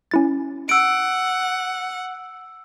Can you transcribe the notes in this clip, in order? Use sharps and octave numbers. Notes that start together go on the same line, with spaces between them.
C#4 E4 A6
F#5 E6 D7